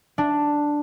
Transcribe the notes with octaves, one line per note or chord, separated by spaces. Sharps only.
D4